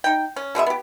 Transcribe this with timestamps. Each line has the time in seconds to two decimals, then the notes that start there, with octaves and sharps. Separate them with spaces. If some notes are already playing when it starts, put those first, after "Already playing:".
0.04 D#4 G5
0.36 C#4
0.55 B2 G#3 B3 E5
0.66 B3 G4